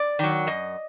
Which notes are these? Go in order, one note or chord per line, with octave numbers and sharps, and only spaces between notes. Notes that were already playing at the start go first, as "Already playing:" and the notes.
Already playing: D5
D#3 F#3
F#2 D#5